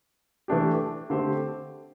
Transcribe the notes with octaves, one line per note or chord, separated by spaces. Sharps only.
E3 A3 D4 G4
D3 A3 C4 G4 C5